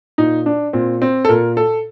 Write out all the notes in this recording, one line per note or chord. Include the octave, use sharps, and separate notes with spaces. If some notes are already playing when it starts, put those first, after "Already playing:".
A#2 D#4
D4
A#2 C4
C4
A4
A#2 A#4
A4